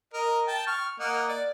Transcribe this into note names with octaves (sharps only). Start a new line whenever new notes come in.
A#4 D#5
G5 A5
C#6 F6
A#3 D#5 F#5
D5